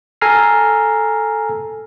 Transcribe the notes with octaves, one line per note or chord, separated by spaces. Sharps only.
A4 G#5 A#5 F6 C7